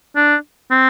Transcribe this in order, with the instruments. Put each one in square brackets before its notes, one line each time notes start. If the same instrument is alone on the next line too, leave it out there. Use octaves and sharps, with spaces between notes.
[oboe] D4
C4